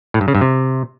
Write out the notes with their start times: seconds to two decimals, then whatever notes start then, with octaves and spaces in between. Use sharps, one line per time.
0.14 A2
0.21 G2
0.28 C#3
0.35 G2
0.41 C3